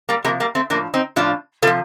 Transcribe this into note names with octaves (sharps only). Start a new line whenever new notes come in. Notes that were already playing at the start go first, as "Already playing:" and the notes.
G3 A#3
C3 F3 G3 A#3
G3 A#3
A3 C4
A2 F3 A#3 D4
C4 D#4
A2 F3 D4 F4
C3 F3 F4 A4